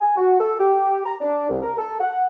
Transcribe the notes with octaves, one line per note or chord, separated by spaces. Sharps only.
G#5
F#4
A4
G4
A#5
D4
C2
A#4
A4
F#5